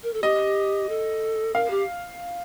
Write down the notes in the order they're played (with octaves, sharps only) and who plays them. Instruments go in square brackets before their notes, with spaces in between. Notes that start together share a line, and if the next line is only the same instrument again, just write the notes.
[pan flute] A#4
A4
[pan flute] G4 [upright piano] D#5
[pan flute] A4
[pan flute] A#4 [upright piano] F5
[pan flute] G4